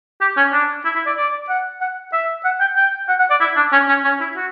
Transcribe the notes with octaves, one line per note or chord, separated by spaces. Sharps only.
G4
C#4
D4
E4
E4
D5
D5
F#5
F#5
E5
F#5
G5
G5
F#5
F#5
D5
E4
D4
C#4
C#4
C#4
E4
F#4